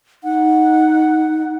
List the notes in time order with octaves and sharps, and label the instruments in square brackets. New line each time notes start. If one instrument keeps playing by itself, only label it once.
[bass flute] D#4 [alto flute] F#5